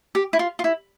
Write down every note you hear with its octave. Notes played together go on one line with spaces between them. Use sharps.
G4
E4
F4
F4
E4